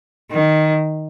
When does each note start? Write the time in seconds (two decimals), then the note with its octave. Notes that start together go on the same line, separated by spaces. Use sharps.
0.32 D#3